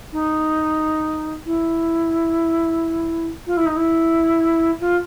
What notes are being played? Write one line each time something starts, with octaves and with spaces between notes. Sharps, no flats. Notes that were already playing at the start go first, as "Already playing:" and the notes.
D#4
E4
F4
E4
D#4
E4
F4